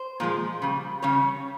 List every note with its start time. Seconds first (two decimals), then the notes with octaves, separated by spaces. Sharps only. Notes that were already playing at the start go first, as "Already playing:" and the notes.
Already playing: C5
0.20 A#2 F3 G#3
0.62 C#3 G3
1.02 C#3 G3 C#5